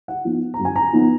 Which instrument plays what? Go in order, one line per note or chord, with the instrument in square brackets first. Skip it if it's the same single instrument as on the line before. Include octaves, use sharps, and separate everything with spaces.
[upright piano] F#5
F3 B3 D#4
A#5
F#2
G#5
A#5
F3 B3 D#4